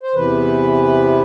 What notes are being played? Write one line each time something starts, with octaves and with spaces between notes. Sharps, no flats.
C5
E2 C3 E3 B4